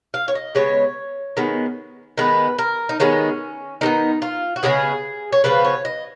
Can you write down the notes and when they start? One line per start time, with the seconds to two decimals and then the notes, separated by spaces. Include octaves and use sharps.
0.14 F5
0.28 C#5
0.35 D#5
0.55 C#3 G#3 B3 C#5
1.37 D#3 G#3 B3
2.18 D#3 G#3 B3 B4
2.58 A#4
2.89 D#4
3.00 D#3 G#3 B3 C#4
3.81 D#3 G#3 B3 D#4
4.22 F4
4.56 F#4
4.63 C#3 F3 G#3 B3 G#4
5.32 C#5
5.44 C#3 F3 B3 B4
5.65 C#5
5.85 D#5